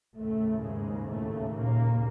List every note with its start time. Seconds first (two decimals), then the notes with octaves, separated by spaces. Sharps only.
0.16 D#2 A2 C#3 A3
0.62 G#2 G#3
1.07 A2 A3
1.53 A#2 A#3